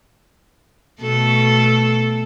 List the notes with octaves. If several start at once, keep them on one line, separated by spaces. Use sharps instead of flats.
B2 A3 A4